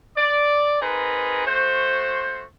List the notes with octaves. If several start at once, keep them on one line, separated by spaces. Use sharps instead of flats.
D5
C4 D#4 G#4 A#4 B4
A3 F#4 C5